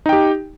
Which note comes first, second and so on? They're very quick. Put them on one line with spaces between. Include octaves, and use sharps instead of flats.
D#4 G5 G4